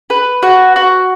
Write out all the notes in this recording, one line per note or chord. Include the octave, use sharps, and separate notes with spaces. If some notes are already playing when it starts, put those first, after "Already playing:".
B4
F#4
F#4